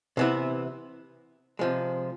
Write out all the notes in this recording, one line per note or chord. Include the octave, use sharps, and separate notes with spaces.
C3 E3 B3 E4
C3 F3 G#3